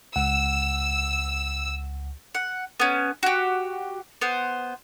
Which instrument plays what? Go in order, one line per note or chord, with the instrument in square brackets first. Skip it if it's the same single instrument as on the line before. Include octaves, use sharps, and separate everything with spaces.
[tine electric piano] C#2 F#5 [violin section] E6
[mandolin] F#5
B3 C#4
F#4 G4
B3 C5